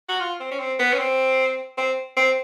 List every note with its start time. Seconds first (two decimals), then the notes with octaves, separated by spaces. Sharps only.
0.09 F#4
0.20 F4
0.40 C4
0.51 C#4
0.59 C4
0.79 B3
0.93 C#4
0.99 C4
1.77 C4
2.17 C4